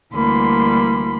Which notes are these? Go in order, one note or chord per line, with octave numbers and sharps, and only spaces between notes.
D2 E3 G3 A#3 B5 C6